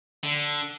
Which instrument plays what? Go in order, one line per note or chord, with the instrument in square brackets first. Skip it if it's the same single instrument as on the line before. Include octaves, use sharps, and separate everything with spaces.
[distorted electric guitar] D3